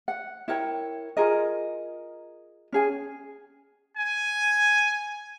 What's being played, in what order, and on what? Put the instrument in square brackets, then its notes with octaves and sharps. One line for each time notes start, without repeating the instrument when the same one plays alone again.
[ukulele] F#5
E4 A#4 C#5 G5
F4 G#4 A#4 D#5
C#4 G#4 G#5
[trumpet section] G#5